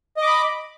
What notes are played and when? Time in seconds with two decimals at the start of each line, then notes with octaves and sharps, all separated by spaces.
0.17 D#5
0.22 D6
0.27 B5